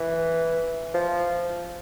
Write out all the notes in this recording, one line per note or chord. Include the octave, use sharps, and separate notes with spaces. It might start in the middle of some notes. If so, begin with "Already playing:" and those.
Already playing: E3
F3